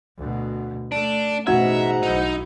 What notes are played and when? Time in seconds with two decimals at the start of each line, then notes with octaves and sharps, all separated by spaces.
0.17 D2 B2
0.92 A3 D4
1.47 A1 G#2 B2 F#4 E5 F#5 A#5 G#6
2.03 B1 D#4 E4